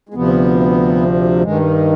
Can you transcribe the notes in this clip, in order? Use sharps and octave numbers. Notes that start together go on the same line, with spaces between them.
G#3
D2 C3 F3 B3
G2 D#3 G#3